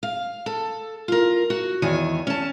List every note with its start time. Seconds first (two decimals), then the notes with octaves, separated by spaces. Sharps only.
0.03 F5
0.46 A4
1.08 F4 A#4
1.50 F#4
1.82 E2 D#3 C#5 G#5
2.27 C#4 A5